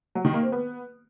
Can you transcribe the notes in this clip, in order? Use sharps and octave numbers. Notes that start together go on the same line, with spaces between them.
F#3
D#3
A#3
C4
B3